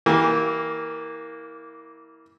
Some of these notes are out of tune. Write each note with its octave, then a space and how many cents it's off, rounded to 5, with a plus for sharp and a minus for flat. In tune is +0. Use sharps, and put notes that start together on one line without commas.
E3 -25 A#3 +0 G4 -30